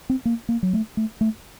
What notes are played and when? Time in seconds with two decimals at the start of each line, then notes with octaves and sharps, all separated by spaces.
0.10 C4
0.25 A#3
0.49 A#3
0.63 F#3
0.73 A3
0.97 A3
1.21 A3